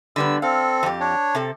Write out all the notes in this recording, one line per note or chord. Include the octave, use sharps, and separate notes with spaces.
D3 G3 B3 E6
C4 A4 F5
F2 G4
D4 C#5
C3 C4 A4